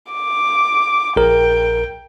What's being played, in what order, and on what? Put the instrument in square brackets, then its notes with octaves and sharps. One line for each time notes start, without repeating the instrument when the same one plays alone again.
[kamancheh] D6
[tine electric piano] A#1 A#4 [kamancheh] G5